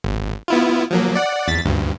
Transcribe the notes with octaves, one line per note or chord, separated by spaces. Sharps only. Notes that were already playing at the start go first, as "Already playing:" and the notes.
G#1
B3 E4 F4
F3 F#3 A#3
D5 F#5
E2 A6 B6
D2 G2